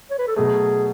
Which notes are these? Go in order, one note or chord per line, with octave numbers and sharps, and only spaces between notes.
C#5
B4
A4
B2 F#3 A3 G#4